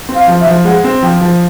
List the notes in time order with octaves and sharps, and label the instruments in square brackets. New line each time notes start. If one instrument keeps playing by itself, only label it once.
[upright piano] C4
[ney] F5
[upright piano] F3
[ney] E5
[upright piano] F3
[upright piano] G#3 [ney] F#5
[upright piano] C4
[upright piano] F3 [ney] G5
[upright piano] F3